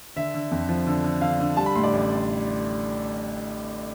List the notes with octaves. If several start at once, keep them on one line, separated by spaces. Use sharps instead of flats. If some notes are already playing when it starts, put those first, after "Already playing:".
D3 E5
D3
F2
F3
D3
D3
D3 F5
D3
G3 A5
B5
A2 C6
D5
A1